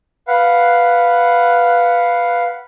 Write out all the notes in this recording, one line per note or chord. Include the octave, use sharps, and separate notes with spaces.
B4 F5 F#5